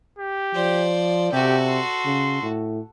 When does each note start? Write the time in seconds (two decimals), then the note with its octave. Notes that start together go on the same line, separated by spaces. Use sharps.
0.19 G4
0.55 F3 C5 D5
1.33 C3 F#4 G4 A4
1.67 C6
2.06 C#3
2.43 A2